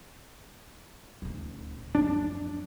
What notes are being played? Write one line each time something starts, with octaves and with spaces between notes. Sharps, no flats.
D#1 D2
F#2 F3 D4